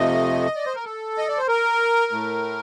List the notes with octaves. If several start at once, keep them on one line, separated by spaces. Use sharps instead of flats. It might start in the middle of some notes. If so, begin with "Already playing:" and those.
Already playing: F2 C3 F3 A3 D#5
D5
C5
A#4
A4
D#5
D5
C5
A#4
A2 A3